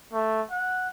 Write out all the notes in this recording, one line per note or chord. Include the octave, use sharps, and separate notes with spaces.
A3
F#5